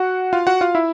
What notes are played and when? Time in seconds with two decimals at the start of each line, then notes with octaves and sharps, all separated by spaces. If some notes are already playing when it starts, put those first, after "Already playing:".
Already playing: F#4 F#5
0.33 F4 F5
0.47 F#4 F#5
0.61 F4 F5
0.75 E4 E5